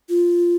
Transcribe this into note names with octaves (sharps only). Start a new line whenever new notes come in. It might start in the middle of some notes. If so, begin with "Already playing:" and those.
F4